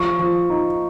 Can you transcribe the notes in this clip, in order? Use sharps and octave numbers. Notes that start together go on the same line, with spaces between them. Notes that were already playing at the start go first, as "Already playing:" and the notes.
Already playing: F3 C#6
F3
D#4